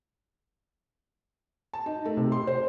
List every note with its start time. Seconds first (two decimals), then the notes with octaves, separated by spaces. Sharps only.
1.73 A5
1.86 D#4
2.05 A3
2.17 C3
2.32 C6
2.47 C5